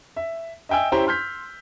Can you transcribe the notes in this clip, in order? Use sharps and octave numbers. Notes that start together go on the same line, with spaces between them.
E5
D#5 E5 G5 G#5 E6
C#4 E4 G4 C5 G5 A#5
C6 F6 G6 B6